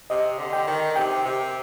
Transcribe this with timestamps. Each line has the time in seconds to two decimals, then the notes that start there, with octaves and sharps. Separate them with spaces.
0.10 C3 D#5
0.38 D3
0.53 G5
0.67 D#3
0.96 C3 G5
1.25 C3